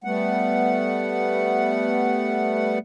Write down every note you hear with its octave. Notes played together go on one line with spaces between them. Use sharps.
G3 A3 B3 F#5